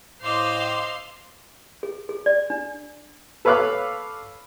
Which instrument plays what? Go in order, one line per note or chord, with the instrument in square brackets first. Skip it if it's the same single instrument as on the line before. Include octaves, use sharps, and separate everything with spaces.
[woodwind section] A2 D6 [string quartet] C5 D#5 E6 [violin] F5 C6
[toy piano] G#4
G#4
D5
D4
[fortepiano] A4 B4 C#5 F5 D6 F#6